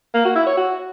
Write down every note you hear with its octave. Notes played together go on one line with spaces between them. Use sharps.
A#3
F#4
E4
C#5
F#4